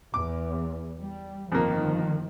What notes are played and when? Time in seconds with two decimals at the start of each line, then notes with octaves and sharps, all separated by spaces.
0.14 E2 D6
1.00 G3
1.52 G1 F2 D#3 F3 A#3